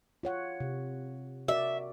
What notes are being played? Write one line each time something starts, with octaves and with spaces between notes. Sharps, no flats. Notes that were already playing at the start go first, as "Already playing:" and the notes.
F4 C#5 F#5
C3
F#4 A#4 D5 E5